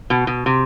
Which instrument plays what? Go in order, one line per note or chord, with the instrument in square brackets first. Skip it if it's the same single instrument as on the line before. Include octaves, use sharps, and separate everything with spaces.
[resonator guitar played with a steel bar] B2
B2
C3